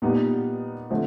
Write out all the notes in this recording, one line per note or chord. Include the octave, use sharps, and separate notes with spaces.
A#2 G3 B3 D#4
D3 F3 A3 C4